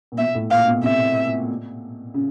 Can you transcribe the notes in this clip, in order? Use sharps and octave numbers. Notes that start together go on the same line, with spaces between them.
A#2
B2 E5
A2
A#2 F5
B2
C3 E5
C#3